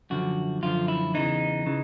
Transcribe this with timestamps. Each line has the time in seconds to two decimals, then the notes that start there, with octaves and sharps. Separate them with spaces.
0.10 F#2 D3 F3 F#4
0.62 F#2 D3 F3 F4
0.88 E4
1.14 E2 C#3 E3 D#4
1.66 C#3 E3